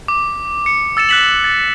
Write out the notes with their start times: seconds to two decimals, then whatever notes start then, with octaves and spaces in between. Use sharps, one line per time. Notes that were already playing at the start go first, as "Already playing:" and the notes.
0.08 D6
0.66 C#7
0.97 E6 A6 C#7 E7
1.09 F#6 A6 B6 E7 F#7
1.44 A6